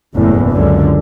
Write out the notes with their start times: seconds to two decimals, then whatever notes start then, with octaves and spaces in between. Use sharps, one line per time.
0.15 F#1 E2 A2
0.51 C#2 F#2 D3